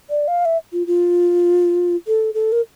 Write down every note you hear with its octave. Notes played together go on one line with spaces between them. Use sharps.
D5
F5
E5
F4
F4
A4
A4
A#4